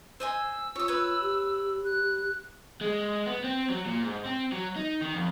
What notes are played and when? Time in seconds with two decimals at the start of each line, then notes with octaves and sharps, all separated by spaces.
0.20 C5 D#5 G#5 E6
0.76 F4 C#5 D#6
0.88 B4 C#5
1.20 G4
1.85 F#6
2.81 G#3
3.26 B3
3.44 C4
3.70 F#3
3.86 A#2
4.04 G#2
4.26 C4
4.53 F#3
4.76 D#4
5.01 D#3
5.14 F2